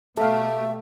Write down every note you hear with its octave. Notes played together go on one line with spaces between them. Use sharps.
B2 A3 G4 A4 E5 F5